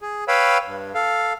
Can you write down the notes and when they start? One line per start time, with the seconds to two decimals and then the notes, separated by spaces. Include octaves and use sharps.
0.01 G#4
0.28 B4 C#5 F5 G5 B5 E6
0.65 G2
0.95 A4 F5